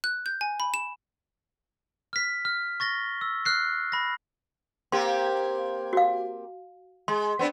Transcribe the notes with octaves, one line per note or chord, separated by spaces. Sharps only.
F#6
G6
G#5
B5
E7
F6 B6
F6
C#6 A6 A#6 G7
E6
F6 F#6 C7
B5 A#6
A#3 C4 G4 C6
F#4 F5
G#3 C6
B3 C4 D4